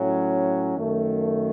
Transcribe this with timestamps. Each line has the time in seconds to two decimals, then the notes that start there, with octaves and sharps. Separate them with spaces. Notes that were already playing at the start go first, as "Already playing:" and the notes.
Already playing: A2 F#3 C#4
0.76 F#2 D#3 A3